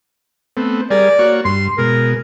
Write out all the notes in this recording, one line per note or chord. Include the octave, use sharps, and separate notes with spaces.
A3 B3 C4
G3 G#4 A#4 D5
A#3 F#4 C#5
G2 C6
B2 G#3 A#4